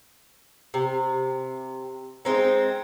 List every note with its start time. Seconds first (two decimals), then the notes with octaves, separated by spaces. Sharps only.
0.74 C3
2.25 G#3 C4 D#4